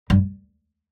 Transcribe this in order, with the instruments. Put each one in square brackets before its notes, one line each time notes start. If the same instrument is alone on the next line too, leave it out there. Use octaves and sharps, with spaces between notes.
[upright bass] G2